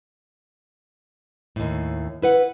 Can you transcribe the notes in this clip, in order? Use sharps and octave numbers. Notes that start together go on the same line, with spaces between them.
D#2 A2
E4 B4 F#5